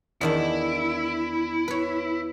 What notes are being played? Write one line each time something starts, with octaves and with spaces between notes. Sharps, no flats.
E2 D#3 D4 E4
B4 C#5